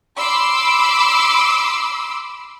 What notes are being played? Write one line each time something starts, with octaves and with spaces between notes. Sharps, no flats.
B5 C6 D6 E6